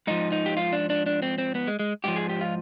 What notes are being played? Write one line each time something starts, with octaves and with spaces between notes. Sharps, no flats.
G#2 F3 D#4
D#4
G4
F4
D4
D4
D4
C4
C4
B3
G#3
G#3
G#2 F3 G4
G#4
G4
F4